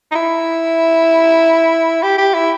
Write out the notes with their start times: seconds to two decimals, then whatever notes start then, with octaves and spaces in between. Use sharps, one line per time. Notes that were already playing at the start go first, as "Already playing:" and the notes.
0.11 D#4
0.15 E4
2.03 G4
2.18 G4
2.34 E4